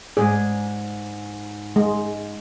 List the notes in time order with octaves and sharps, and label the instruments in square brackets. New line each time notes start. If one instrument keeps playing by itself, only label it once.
[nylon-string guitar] G#2 B2 D5 [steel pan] G#4
[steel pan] G#3